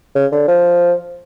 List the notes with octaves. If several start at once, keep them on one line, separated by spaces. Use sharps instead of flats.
C#3
D3
F3